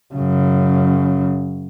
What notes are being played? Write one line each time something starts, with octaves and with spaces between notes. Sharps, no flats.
F#2 C#3